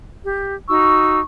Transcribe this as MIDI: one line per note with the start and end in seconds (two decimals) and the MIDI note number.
0.24 0.54 67
0.69 1.20 63
0.69 1.20 66
0.69 1.24 85
0.69 1.20 88